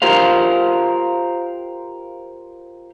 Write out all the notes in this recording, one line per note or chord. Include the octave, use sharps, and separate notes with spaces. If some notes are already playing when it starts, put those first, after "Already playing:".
F4 G4 A#4 C5 F5